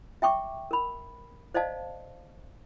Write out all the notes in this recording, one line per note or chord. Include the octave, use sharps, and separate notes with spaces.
E5 G5 C#6 D6
A#4 B5
C5 D5 D#5 F5 A5